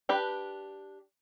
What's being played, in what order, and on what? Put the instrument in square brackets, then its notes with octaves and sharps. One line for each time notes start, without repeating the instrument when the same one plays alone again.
[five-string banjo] D4 G4 B4